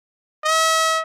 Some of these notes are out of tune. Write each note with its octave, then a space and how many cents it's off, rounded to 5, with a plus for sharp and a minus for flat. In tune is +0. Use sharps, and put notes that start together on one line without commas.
E5 -40